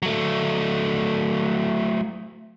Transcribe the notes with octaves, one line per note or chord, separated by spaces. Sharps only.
F#3 A3